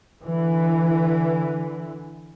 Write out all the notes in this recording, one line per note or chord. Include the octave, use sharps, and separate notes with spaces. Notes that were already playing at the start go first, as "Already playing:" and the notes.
D3 E3